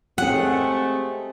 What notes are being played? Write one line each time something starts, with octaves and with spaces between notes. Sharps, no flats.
G#3 A3 C4 G4 G#4 F#5